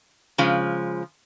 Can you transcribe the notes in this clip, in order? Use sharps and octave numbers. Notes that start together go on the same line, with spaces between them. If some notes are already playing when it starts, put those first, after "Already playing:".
C#3 F3 G#3